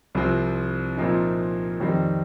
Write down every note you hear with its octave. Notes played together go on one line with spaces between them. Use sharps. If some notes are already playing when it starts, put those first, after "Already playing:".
C2 C3 F3 C4
A#2 F3 C4 D#4
F2 D#3 G3 C4 D#4